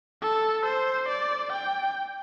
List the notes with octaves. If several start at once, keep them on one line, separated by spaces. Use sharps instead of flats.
A4
C5
D5
G5